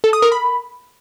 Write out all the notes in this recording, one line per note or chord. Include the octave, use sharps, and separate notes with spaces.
A4
D#6
A#4
B5